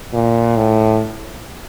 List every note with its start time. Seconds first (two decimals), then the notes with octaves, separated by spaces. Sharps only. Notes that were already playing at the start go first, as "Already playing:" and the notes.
0.13 A#2
0.57 A2